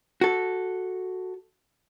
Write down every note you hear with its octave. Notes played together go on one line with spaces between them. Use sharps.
F#4 A4